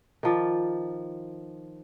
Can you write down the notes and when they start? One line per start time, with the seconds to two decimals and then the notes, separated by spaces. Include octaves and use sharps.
0.23 D#3 F3 D5